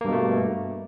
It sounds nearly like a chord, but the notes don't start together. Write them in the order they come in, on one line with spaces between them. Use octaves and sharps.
A#3 G2 B2 A3